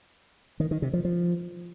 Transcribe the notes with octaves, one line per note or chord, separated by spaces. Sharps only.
D#3
D#3
C3
F3
F3